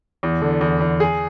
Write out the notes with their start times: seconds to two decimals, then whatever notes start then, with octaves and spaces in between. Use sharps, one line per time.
0.23 E2
0.42 D3
0.61 E2
0.80 E2
1.00 G#4